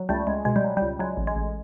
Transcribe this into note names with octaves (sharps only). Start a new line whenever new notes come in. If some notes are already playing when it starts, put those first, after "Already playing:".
Already playing: F#3
C#2 G3 A3
C#2 G#3
B2 G#3
G3
F#3
C#2 G3
F#3 G#3
A1
G#3
A1